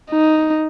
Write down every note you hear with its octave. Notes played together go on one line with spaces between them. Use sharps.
D#4